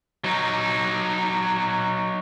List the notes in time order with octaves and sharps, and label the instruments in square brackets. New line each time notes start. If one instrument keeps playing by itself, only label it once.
[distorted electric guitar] F#3 D#4